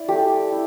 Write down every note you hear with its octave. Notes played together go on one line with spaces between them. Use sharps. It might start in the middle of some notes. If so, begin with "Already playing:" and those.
Already playing: E4 D5
A3 G4
E4